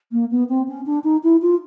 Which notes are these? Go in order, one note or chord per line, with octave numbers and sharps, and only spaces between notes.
A#3
B3
C4
C#4
D4
D#4
E4
F4